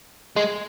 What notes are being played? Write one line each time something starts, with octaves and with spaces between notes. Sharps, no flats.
G#3